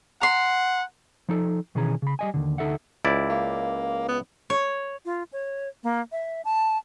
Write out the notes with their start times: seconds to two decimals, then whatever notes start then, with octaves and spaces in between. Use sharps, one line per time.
0.21 F#5 A#5 C6
1.29 F3 D#4 A4
1.75 B2 D#3 E3 C#4 G#4 A#5
2.02 C#3 B5
2.19 G3 D#5 G#5
2.34 D#2 G#2 D3
2.58 D2 D#4 A4 E5 F#5
3.05 C#2 E4 D5
3.29 A#3
4.08 B3
4.50 C#5
5.05 F4
5.32 C#5
5.83 A#3
6.12 E5
6.45 A5